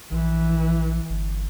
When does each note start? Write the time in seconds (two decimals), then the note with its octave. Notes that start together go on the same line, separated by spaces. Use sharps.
0.12 A#1 E3
1.10 G1